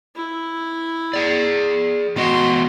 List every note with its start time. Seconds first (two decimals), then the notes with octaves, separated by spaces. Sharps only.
0.15 E4
1.13 G#4 D5
2.16 E2 B3 F#4 D#5 C6